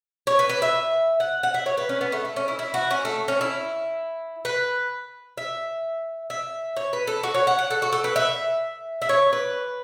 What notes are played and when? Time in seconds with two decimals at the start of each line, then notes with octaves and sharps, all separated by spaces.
0.27 C#5
0.39 B4
0.49 B4
0.62 E5
1.20 F#5
1.43 F#5
1.54 E5
1.66 C#5
1.78 B4
1.89 C#4
2.01 B3
2.12 A3
2.25 A3
2.36 C#4
2.48 E4
2.59 E4
2.74 F#4
2.91 C#4
3.05 A3
3.28 C#4
3.41 E4
4.45 B4
5.38 E5
6.30 E5
6.77 C#5
6.93 B4
7.07 A4
7.23 F#4
7.34 C#5
7.47 F#5
7.59 F#5
7.71 A4
7.82 F#4
7.93 A4
8.04 B4
8.16 E5
9.02 E5
9.09 C#5
9.33 B4